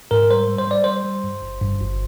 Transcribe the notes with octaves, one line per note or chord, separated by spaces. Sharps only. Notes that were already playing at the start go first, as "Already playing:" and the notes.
G#2 A#4
G3 C5
G3
C5
G3 D5
G3 C5
G3
G2
G1
G2
G1